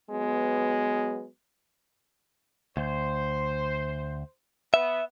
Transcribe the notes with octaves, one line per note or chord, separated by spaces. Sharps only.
F#3 G#3 B3
D2 C5
B3 E5